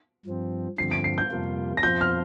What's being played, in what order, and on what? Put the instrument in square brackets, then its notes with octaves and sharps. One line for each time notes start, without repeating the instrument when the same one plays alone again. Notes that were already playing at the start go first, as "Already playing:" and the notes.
[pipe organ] G2 F3 C4
[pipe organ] G2 D3 F3 C4 [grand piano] C7
[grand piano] D7
C7
G6
[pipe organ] F2 C3 G3 A#3 F4
[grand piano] A#6
[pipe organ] F2 F3 C4 F4 C5 [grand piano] G6
[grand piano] F6